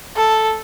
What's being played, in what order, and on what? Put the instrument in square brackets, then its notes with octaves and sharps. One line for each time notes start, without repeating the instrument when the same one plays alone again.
[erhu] A4